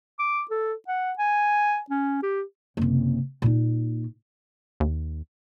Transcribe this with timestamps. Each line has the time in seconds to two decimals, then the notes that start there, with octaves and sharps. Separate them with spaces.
0.19 D6
0.51 A4
0.88 F#5
1.18 G#5
1.90 C#4
2.23 G4
2.77 F#1 C3
3.42 A#2 D#4
4.80 D#2